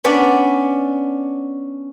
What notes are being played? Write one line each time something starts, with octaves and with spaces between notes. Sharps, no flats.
B3 C#4 D4 D5